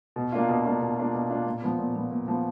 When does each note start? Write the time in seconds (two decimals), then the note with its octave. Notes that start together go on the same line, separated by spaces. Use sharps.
0.16 B2
0.32 A#3 D4 F4
0.49 B2
0.65 A#3 D4 F4
0.80 B2
0.98 A#3 D4 F4
1.13 B2
1.30 A#3 D4 F4
1.46 A#2
1.62 F3 B3
1.79 A#2
1.95 F3 B3
2.11 A#2
2.28 F3 B3